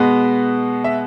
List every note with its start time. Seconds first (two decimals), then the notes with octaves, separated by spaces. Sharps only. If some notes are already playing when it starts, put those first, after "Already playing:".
Already playing: B2 G#3 B3
0.84 E5